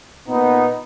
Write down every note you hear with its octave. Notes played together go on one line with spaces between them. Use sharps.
A#2 B3 D#4